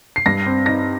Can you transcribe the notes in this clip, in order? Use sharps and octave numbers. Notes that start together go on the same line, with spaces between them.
C7
G2 A#6
C4
D#4 A#6